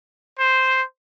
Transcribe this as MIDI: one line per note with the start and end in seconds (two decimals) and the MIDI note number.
0.39 0.82 72